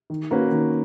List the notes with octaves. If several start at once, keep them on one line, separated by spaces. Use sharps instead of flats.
D#3
A#3 C#4 F#4 B4
D#3